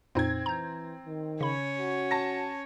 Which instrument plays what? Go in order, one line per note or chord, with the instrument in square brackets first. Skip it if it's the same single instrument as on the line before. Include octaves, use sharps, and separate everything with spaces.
[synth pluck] F2 A#2 D#4 [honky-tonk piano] C4 G#6
[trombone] E3 [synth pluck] A#5 G6
[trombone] D#3
[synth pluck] C#3 B5 [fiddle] C#4 C#5
[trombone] F#4
[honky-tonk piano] A5 A#6